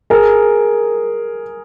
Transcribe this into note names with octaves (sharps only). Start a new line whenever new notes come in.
G#4 A#4